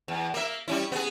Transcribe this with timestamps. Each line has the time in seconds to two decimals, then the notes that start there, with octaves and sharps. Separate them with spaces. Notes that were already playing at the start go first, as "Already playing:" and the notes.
0.08 E2
0.34 A#3 E5
0.68 G3 C#4 E4
0.92 B3 G#4